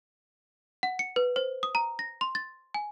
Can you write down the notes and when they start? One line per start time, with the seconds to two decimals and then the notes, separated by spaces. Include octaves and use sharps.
0.83 F#5
0.99 C#7
1.16 B4
1.36 C5
1.63 D#6
1.75 A#5
1.99 A#6
2.21 C6
2.35 A6
2.74 G#5